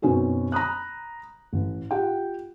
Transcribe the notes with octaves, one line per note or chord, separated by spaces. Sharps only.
F#2 B2 C4 C#4 D#4 F#4
A#5 B5 D#6 F#6
A1
F4 G4 F#5 G5